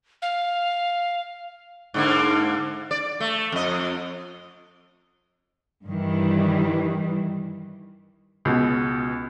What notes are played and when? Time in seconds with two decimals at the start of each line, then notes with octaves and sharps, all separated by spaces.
0.22 F5
1.94 G#2 D3 A#3
2.91 D5
3.20 A3
3.52 F2 D#5
5.86 G2 D#3 E3 G3
8.45 C#2 B2